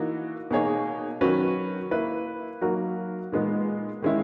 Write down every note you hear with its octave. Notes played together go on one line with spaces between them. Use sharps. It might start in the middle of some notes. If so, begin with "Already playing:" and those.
Already playing: E3 A#3 D#4 F#4
B2 A#3 D#4 G#4 C#5
D#3 F#3 C#4 F#4 B4
A#3 E4 B4
F#3 A#3 D#4 F#4 A#4
A#2 G#3 B3 D#4
D#3 G#3 C#4 E4